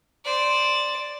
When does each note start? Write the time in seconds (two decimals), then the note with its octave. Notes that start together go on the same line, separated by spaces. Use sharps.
0.25 C5 D5